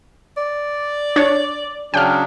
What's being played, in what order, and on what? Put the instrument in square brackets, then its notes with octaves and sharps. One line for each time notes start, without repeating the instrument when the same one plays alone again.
[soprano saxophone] D5
[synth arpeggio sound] D4 C#5
[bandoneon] C#3 F#3 D4 [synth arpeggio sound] G5 F6